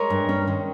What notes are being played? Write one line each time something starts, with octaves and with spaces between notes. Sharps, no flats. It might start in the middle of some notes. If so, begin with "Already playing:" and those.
Already playing: G#3 A#4 C#5
G2
C#4
D#3